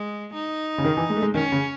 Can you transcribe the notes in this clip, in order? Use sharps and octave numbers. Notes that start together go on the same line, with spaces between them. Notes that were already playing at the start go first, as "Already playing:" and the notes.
Already playing: G#3
D#4
C#3
D#3
E3
G#3
A3
G#3
D#3 C#4
C#3